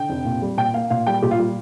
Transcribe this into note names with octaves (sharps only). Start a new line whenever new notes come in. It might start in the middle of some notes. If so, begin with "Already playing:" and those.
Already playing: D3 G5
F1
A#2
G3
A#2 G5
A#3 F5
A#2 F5
G3 G5
A#2 G4
F4
G3